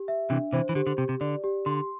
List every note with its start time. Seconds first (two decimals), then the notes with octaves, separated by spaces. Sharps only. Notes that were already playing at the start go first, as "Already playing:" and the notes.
Already playing: G4
0.08 E5
0.30 C3 E3 D4
0.52 C3 E3 C5
0.69 E3
0.75 D3 G4
0.87 D3
0.98 C3 G4
1.09 C3
1.21 D3 D5
1.44 G4
1.66 D3 C6